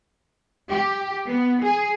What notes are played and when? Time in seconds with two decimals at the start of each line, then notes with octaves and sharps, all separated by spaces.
0.69 G4
1.26 B3
1.62 G#4